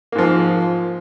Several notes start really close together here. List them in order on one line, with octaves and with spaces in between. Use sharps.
A#3 G#2 F3